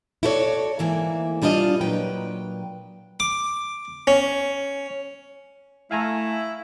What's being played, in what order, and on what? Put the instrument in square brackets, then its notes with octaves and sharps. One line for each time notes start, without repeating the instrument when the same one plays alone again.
[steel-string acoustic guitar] E4 F#4 A4 B4 C#5 D5
D2 G#2 E3 A#3 E5
E3 G3 D4 F4 D#5
A#2 F#3 B4 G5
[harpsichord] D6
C#4
[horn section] A3 [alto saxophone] E4 [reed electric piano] F5 G#5 A#5